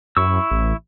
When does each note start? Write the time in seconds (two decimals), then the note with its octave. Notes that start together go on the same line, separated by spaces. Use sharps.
0.17 F#2 E4 C#6 E6
0.51 A1